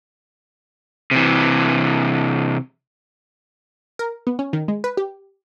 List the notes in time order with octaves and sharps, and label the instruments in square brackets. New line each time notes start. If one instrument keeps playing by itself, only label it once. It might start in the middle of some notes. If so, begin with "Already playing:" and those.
[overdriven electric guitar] C3 E3
[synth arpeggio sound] A#4
B3
C#4
D#3
G#3
B4
G4